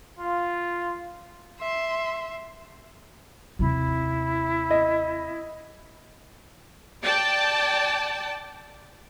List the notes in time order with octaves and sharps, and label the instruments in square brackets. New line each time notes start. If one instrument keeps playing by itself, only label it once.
[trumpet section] F4
[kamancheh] E5 C6
[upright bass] D#2 C3 [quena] E4
[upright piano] D#5
[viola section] D5 G5 A5